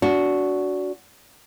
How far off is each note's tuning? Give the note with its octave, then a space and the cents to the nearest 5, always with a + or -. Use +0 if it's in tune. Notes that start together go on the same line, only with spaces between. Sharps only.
D4 -25 F#4 +0